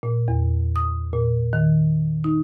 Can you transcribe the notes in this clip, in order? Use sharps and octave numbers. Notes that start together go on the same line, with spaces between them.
A#2
E2
D#6
A#2
D#3
D#4